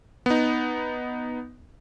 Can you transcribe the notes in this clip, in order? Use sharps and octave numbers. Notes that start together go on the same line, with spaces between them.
B3 D#4